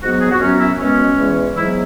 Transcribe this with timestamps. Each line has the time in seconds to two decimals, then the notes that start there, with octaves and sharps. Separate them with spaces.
0.02 G#2 F#3 B3 F#4
0.13 F#4
0.21 G#4
0.31 F#4
0.41 F#2 F#3 B3 C#4
0.60 E4
0.79 B2 G#3 B3 C#4
1.18 E2 E3 G#3
1.56 G#2 F#3 B3 E4